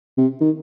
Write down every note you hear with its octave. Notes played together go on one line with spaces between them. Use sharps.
C3
D#3